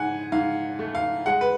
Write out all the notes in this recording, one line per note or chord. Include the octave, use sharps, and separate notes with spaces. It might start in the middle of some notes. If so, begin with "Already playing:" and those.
Already playing: G#2 F#5 G#5
G#2 F5
A3
F5
G#3 F#5
B4